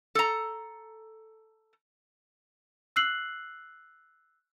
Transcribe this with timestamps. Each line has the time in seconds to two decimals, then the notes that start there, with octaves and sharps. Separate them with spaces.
0.15 A4 A#5
2.96 E6 F#6 C7 F#7